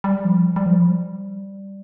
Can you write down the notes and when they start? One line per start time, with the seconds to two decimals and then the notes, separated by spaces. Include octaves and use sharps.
0.04 G3
0.25 F3
0.56 G3
0.66 F3
0.85 G3